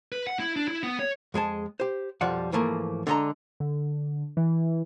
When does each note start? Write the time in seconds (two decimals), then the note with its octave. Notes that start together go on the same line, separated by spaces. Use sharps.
0.12 B4
0.27 F#5
0.40 E4
0.56 D4
0.68 E4
0.83 B3
0.99 C#5
1.34 F2 G#3 G#4 A5
1.80 G4 C5
2.21 B1 F2 F3 G3 D5 F#5
2.52 G#2 E3 F3 A3 A#3
3.07 D3 G#3 D#5 A5 A#5
3.60 D3
4.37 E3